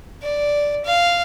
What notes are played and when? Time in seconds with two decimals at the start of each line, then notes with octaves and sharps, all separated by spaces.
0.23 D5
0.85 F5